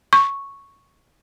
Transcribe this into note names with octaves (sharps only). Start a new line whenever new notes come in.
C#6